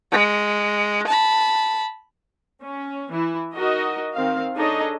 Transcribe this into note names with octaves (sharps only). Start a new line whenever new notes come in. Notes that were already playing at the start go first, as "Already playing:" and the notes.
G#3
A5 B5
C#4
E3 E4
D#4 F#4 A#4 D#5
D#3 C4 F5
D4 D#4 G#4 A4 C#5 D#5